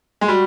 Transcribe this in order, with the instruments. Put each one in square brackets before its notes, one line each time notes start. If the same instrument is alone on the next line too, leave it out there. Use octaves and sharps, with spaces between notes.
[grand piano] G#3
[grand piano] G3 [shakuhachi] F#4